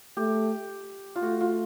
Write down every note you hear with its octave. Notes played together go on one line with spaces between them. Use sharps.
A3 G4
F4
A3 F#4
F4